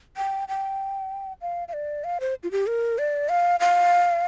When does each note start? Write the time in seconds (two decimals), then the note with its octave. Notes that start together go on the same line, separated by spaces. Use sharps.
0.17 G5
0.48 G5
1.41 F5
1.68 F5
1.73 D5
2.04 F5
2.20 C5
2.43 F4
2.51 G4
2.67 A#4
2.98 D5
3.29 F5
3.60 F5